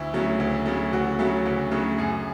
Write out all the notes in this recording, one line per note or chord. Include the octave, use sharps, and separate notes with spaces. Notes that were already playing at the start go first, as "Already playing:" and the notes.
Already playing: D2 E4
C#3 F#3 A3
D2
C#3 F#3 A3
D2 F#4
C#3 F#3 A3
D2
C#3 F#3 A3
F#2 G#4